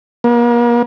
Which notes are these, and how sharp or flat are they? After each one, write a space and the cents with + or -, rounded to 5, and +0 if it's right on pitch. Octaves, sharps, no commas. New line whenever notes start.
A#3 +40